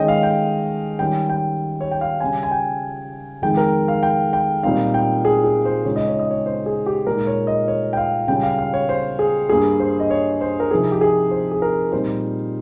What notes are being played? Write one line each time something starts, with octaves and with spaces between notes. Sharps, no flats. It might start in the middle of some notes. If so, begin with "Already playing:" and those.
Already playing: D#3 G#3 C#4 D#5 G5
F5
G5
D#3 G3 C#4 G5
G5
C#5
G5
F5
C#3 G3 C#4 G#5
G#5
G5
F2 D#3 G#3 D#4 G5
A#4
F5
G5
G5
A#2 G3 C4 D#4 F5
G5
G#4
G#4
C5
C#3 G#3 D#4 C#5
D#5
C#5
D#5
C#5
C5
G#4
G4
A#2 G#3 D#4 A#4
C#5
D#5
C#5
G5
F5
C#3 G3 C#4 G5
F5
F5
C#5
C5
G#4
G2 G3 A#3 G#4
C5
D#5
C#5
C5
A#4
C3 F3 C4 D#4 G#4
G4
G#4
C5
G#4
A#4
A#2 G3 C4 D#4 C5